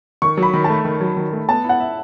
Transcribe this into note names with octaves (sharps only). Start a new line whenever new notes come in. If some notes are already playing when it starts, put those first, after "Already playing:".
D#3 C#6
F#3
B5
D#3
A5
A3
D#3
F#3
D#3
A3
B3 A5
E4 F#5
E5